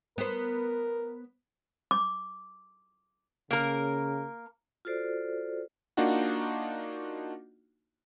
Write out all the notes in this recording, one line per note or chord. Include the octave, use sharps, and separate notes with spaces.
B3 A#4 C5
D6
C#3 A#3 A#4
F4 F#4 A4 C5 D5
A#3 D4 D#4 F4 F#4 F#5